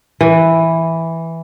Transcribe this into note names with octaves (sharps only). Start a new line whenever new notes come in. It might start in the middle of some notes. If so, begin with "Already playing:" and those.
E3